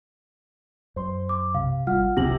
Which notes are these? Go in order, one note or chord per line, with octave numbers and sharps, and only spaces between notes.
F#2 C5 C6
D6
B1 C3 F5
G#1 G3 F4 F#5 F6
E1 C2 F2 C3 A#6 F#7